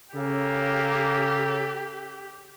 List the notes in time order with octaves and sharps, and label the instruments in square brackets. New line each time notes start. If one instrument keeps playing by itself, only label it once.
[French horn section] C#3 [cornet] A#3 [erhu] G4 [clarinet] A4